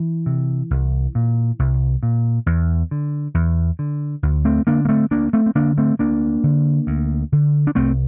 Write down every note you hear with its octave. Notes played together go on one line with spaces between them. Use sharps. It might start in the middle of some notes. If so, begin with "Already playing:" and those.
Already playing: E3
C3
C2
A#2
C2
A#2
E2
D3
E2
D3
D2
A3 C4
D3 A#3 D4
A#3
A3 C4
D2 A#3 D4
A3 C4
C4
D3 A#3 D4
A3 C4
D2 A#3 D4
D3
D2
D3
D4
C2 A3 C4